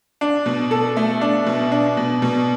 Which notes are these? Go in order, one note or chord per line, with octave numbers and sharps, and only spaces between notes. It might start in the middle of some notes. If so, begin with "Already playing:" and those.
D4
B2
A4
A3
D4
B2
D4
B2
B2